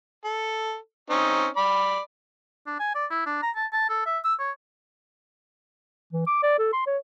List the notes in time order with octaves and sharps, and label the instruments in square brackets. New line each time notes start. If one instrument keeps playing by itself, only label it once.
[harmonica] A4
C4 C#4 D#4
D5 B5
[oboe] D4
G#5
D5
E4
D4
A#5
A5
A5
A4
E5
E6
C#5
[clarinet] E3
D6
D5
A4
C6
C#5